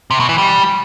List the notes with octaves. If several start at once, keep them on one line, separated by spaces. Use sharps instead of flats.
C3
B2
E3
G3